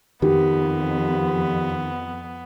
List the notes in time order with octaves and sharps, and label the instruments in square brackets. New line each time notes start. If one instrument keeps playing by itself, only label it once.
[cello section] F2 [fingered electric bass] D#3 [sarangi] B3 [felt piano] G4